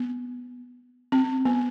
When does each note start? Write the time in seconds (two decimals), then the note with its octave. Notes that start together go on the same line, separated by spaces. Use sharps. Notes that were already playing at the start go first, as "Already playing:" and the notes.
Already playing: B3
1.12 C4
1.45 B3